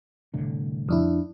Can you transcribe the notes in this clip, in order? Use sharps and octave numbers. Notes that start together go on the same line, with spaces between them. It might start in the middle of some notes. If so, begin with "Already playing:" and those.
C2 A2 D3
F2 D4 E4